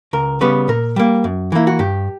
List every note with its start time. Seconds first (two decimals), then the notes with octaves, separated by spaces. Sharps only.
0.13 C#2 A#4
0.41 C#3 G3 B3 B4
0.68 A#2 A#4
0.96 G3 A#3
1.24 F#2
1.52 E3 A#3 E4
1.67 F#4
1.79 G2 G4